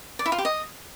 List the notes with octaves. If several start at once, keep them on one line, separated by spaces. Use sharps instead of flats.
D5
E4
F4
G4
D#5